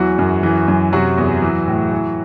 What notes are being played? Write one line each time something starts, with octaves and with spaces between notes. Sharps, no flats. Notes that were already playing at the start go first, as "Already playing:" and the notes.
Already playing: E2 E3 F#3 F#4
F#2
E3
F#2
C3 F#3 F#4
E2
E3
A2
E3